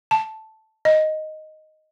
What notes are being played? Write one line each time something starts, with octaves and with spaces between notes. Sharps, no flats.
A5
D#5